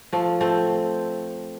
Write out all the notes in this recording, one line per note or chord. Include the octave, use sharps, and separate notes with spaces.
F3 A3
A3 C4